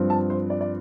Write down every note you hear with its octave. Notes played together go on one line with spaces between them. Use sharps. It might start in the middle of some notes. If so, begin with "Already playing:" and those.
Already playing: G2 F3 C4
A5
C5
D5
D5